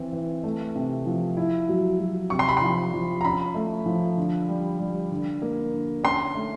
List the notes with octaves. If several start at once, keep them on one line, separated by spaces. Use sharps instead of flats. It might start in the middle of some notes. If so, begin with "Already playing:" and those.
Already playing: E3 C4
E3
A3
C3
F3
E4
F#3
F#3
C3 C#6
C6
B5
F3 C6
F3
A#5
C#4 B5
A3
F3
D3
G3
G3
D3
A#3
D3
C#4 C6
A3